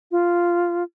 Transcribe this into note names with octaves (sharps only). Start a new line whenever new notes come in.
F4